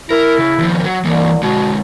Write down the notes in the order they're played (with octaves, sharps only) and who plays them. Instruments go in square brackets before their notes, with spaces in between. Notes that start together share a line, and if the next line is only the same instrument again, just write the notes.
[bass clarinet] E4 [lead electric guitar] A#4
[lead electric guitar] C#3
D#2 F3
F#3
[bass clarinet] C2 [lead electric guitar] E3 A#3
[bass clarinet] B2 [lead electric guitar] D3 G#3